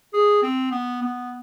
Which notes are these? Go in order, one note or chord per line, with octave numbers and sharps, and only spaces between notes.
G#4
C4
B3
B3